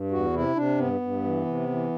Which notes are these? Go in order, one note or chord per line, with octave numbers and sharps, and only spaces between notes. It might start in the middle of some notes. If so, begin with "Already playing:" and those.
Already playing: G2
E2 F#4
C3 E4
C3 D4
G2 B3
G2
E3
C3
E3